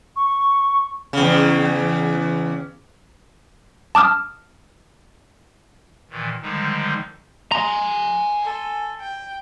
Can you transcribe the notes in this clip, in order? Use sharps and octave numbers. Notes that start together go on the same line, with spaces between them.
C#6
E2 C#3
A5 D6 D#6 F6
A#2 D#3 E3
D3 D#3 F3 G3 G#3 D#4
G#5 A#5 C6
A4
G5